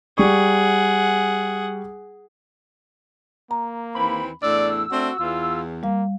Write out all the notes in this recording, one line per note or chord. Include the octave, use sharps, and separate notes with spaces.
G3 G#4 F#5 C#6
A#3 A#5
D#2 E3 C4 B5
E2 A2 D4 D5 E6
A3 C4 D4 F#4
E2 F4
G3 A#3 F5